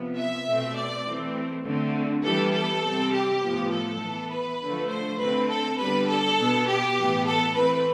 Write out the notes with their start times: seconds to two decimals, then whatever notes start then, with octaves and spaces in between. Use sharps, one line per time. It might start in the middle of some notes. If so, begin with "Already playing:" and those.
Already playing: C3 F3 B3
0.17 E5
0.47 B2 A3 C4
0.76 D5
1.06 E3 A3 C4
1.65 D3 A3 C4
2.24 E3 G3 B3 A4
2.53 A4
2.83 C3 G3 C4
3.13 G4
3.42 A2 F3 B3
3.72 A4
4.01 E3 B3
4.31 B4
4.61 D3 F3 A3
4.90 C5
5.19 D3 A3 C4 B4
5.49 A4
5.78 D3 G3 B3 B4
6.08 A4
6.37 B2 B3
6.67 G4
6.97 A2 E3 B3
7.26 A4
7.55 E3 A3 C4 B4